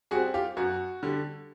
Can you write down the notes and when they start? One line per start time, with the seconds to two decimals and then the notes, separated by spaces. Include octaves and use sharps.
0.11 G3 F#4 G#4
0.15 C4
0.34 F4 G4
0.57 F#2 F#4
1.03 D3 G3